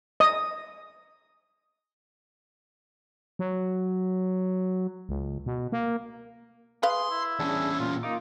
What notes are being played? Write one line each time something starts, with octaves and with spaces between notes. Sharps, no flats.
D#5 D#6
F#3
C#2
B2
A#3
G#4 B4 F5 C6
E4
E2 C#4 D4 G#4 A5
A#2 F4
A#3 D#4 F4 D6